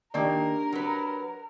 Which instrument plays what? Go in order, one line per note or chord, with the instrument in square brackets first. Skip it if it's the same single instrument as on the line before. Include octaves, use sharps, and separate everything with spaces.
[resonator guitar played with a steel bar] D#3 A#3 [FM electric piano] D4 G4 [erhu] A#4
[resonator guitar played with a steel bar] F#3 B4